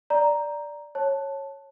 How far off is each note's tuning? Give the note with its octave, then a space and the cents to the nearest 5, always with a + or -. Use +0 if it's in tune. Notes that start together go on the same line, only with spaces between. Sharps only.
D5 -5 A#5 +0
C#5 -15 A5 +0